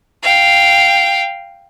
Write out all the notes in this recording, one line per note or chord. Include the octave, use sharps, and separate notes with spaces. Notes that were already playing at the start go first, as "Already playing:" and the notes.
F5 G5